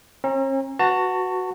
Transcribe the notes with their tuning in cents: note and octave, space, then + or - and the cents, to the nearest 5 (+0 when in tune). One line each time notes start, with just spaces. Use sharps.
C#4 -45 A#5 +0
F#4 +0 B4 +0 A5 +25